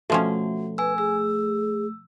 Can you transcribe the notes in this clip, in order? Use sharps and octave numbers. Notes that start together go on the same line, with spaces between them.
B2 F3 A3 C#4 F#4
B4 G#5 E6
G#4 E6